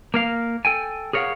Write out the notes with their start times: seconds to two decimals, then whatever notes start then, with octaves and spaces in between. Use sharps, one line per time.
0.14 A#3 A#4 F5
0.65 A4 G5 G#5
1.13 G#4 A#4 C#5 D#5 F5 F#5